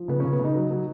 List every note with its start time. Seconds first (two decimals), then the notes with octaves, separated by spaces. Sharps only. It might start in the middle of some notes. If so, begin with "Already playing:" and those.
Already playing: F3
0.08 C#3 B3
0.20 C#3 C#4
0.33 B3
0.39 C#3 D#4
0.55 F#3
0.71 F#3